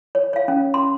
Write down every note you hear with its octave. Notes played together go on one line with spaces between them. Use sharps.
C#5
C#5 F5
C#4
C6